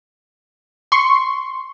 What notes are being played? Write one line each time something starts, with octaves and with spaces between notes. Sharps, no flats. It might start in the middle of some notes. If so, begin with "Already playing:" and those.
C6 C#6